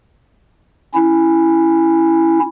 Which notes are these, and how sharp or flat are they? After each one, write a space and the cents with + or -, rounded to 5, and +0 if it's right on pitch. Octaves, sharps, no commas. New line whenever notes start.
C#4 -15 E4 +0